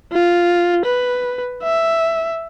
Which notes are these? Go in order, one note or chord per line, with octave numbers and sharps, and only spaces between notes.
F4
B4
E5